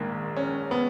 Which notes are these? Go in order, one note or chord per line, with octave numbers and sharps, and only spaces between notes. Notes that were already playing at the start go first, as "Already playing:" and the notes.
Already playing: A#1 G#2 D#3 A#3
C#4
B3